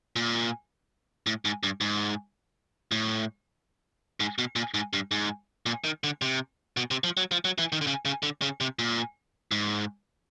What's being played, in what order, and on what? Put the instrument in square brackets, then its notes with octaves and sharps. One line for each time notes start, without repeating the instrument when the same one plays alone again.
[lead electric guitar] A#2
A2
G#2
G2
G#2
A2
G#2
B2
A#2
G#2
G2
G#2
A#2
D#3
D3
C3
B2
C3
F3
F#3
F3
F#3
E3
D#3
D3
C#3
C#3
D3
C#3
C3
A#2
G#2